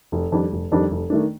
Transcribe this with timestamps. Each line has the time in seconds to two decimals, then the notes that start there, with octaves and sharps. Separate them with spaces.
0.12 F1
0.32 F2 D#3 G3 D4
0.52 F1
0.72 F2 D#3 G3 D4
0.91 F1
1.10 D#3 A3 D4